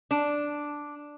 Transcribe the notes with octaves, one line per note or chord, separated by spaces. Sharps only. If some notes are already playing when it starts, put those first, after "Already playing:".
D4